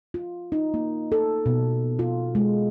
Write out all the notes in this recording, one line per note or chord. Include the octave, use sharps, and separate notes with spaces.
F4
D#4
A#3
A4
B2
F4
G#3